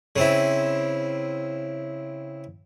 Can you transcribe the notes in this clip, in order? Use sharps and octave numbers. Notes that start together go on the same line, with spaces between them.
C#3 C4 E4